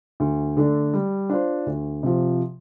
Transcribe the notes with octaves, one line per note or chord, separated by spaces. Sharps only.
D2
D3 A3 D4
G3
D4 F4 C5
D2
C3 F3